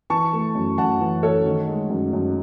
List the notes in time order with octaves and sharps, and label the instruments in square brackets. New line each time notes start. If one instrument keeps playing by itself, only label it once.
[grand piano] E3 A5 C#6
A3
F#2
F#2 F#5 A5
E3
A3 A4 C#5
D#3
G#3
F#2
F#2